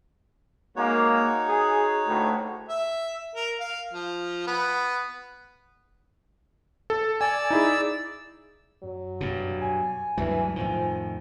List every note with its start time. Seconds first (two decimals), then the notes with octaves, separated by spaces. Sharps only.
0.76 G#3 A#3 D#4 F#4 C#5
1.48 G#4
2.06 D2 A2
2.69 E5
3.35 A#4
3.60 F5
3.93 F3
4.47 B3
6.90 A4
7.21 D5 G#5 E6
7.51 D#4 E4 G#4
8.83 F#2 F#3
9.21 G2 B2
9.62 G#5
10.18 D2 G2 E3 F#3
10.56 F2 A2 D#3 F3